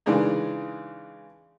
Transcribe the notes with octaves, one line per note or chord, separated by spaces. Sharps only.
C#3 E3 G#3 D4 D#4